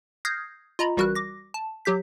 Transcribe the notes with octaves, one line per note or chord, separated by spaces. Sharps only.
D#6 F6 G6 G#6 A#6 C7
F4 D#5 A#5 B5
A1 G3 F#4 A#4 F#6
D6 A#6
A5
F#3 G4 G6 B6